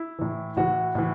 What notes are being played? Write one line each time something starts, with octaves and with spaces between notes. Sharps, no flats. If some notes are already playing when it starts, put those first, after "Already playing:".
Already playing: E4
A2 E3
A2 E3 F#4
A2 E3